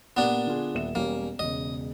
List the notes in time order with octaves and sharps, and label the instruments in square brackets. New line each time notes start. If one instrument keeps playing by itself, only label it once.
[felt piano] A#2 G4 A#4 [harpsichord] B3 D4
[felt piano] D3 F4 G#4
D#1 E5 E7
[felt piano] E1 G3 C#4 [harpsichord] A#3
[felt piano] E1 C#3 [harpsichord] D#5